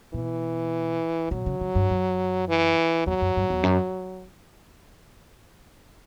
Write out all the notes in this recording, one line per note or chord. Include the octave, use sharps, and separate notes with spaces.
B2 E3
B2 F#3
C#3
C#3
G2
F#2
E3
E2 F#3
F#2
G2
E2
F#2